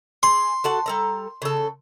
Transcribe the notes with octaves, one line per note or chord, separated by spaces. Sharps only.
G#4 C6
F#4 A4 F#5
G3 A4 A#5
C#3 A4